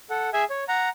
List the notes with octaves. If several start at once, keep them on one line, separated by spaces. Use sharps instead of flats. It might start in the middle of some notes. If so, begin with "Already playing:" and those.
A4 F#5
G#4 E5 G#5
C#5
F#5 A#5